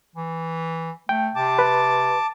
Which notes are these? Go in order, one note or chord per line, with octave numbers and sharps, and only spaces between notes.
E3
A3 G5
C3 A5 D6
B4